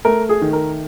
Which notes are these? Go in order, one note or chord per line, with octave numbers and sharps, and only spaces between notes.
A3 A#4
G#4
D#3
A#4